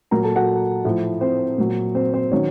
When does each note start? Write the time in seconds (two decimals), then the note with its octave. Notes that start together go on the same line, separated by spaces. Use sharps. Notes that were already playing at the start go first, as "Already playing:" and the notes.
0.11 A#2 F#3 A#4 A#5
0.23 A4 A5
0.36 F#4 F#5
0.85 A2 F3
1.21 C4 C5
1.58 A#2 F#3
1.95 C4 C5
2.13 C4 C5
2.31 D#3 F#3 C#4 C#5